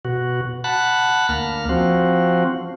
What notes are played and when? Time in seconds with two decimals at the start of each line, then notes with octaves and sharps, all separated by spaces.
0.05 B2 F#4
0.64 F#5 A5 B5 F#6
1.29 D2 A#3 F6
1.69 F3 C4 F#4